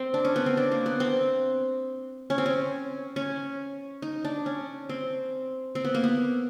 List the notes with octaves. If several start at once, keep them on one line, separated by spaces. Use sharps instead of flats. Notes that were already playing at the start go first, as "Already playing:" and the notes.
Already playing: C4
D4
C#4
B3
C4
D4
A#3
B3
C4
C#4
C4
C#4
C#4
D#4
D4
C#4
C4
C4
B3
A#3
B3